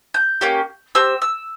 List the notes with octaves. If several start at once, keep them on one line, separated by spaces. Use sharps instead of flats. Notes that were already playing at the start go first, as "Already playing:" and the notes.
G6
A#3 C#4 G4
C4 G4 E6
E6